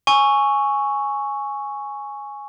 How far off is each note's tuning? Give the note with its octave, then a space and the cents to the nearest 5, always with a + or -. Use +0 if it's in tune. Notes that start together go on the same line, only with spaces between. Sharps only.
G#5 +0 C#6 +0 E6 +0